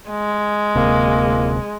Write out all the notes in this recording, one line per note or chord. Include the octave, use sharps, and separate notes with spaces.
G#3
D1 C3 A#3